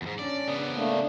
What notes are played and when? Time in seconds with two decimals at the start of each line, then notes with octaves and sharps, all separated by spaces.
0.02 E2 G#2
0.19 C#4 D4 D5
0.48 C#3 B3
0.75 A3 A#3 D4